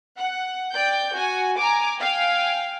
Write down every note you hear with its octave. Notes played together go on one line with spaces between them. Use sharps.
F#5
D5 G5 G6
F#4 G#5
G#5 A#5 D6
F5 G5 G#5